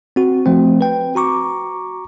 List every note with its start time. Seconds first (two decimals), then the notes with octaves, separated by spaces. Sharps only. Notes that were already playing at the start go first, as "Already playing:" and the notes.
0.16 C4 F#4
0.46 F3 A3 C4
0.81 B4 G5
1.15 F#4 A#5 C#6 D6